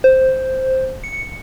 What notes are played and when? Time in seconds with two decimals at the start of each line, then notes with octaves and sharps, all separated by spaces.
0.04 C5
1.04 C#7